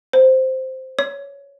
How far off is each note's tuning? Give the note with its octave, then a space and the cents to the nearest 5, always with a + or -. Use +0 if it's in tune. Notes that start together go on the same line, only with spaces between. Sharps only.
C5 +0
C#5 +15